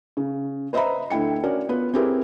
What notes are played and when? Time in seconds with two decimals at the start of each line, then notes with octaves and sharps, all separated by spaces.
0.17 C#3
0.73 B4 C5 D#5 E5 A#5 B5
1.10 D2 A3 E4 G5 C#7
1.44 C#4 F#4 A#4 D5
1.69 B3 F4 B4
1.94 C4 E4 G4 G#4 A#4 B4